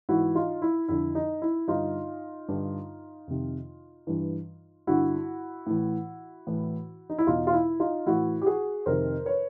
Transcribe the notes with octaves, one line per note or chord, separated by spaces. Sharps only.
G#2 E3 E4 F#4
D#4 F4
E4
F2 D3 E4
D#4
E4
G2 D3 D#4 F4
G2 D3
F2 C3 D#3
G2 E3
G2 D3 E4 F#4
A2 E3
A2 E3
D#4
E4
E2 B2 D#4 F4
F4
E4
D#4 F4
A2 E3 E4 F#4
G4
F#4 G#4
F2 C3 D#3 A#4 C5
B4 C#5